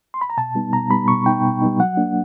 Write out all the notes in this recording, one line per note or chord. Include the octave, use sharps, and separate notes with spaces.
C6
B5
A#5
B2 A5
G3 B3 D#4
B2 A#5
G3 B3 D#4 B5
B2 C#6
G3 B3 D#4 G5
B2
G3 B3 D#4
F#3 F#5
A#3 D4